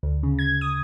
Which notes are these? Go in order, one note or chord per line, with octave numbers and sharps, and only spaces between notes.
D2
C#3
G#6
D#6